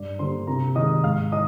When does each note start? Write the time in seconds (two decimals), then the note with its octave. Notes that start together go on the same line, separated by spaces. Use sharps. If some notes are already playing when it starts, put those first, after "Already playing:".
Already playing: G2 D5
0.19 D3 G3 A#3 C5 C6
0.47 C3 A#4 A#5
0.75 D#3 G#3 D#5 D#6
1.03 G#2 F5 F6
1.32 D#3 D#5 D#6